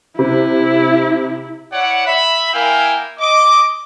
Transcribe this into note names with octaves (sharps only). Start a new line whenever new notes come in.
C3 E4
E4 C#5 D5 F#5
E5 B5
A#3 E4 A#4 F5 G5 G#5
D#5 D6